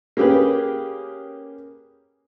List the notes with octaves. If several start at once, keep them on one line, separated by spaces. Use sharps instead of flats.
A#3 C#4 G4 G#4 B4